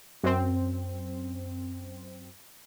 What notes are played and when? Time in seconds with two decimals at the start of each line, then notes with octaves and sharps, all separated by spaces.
0.23 F#2 C4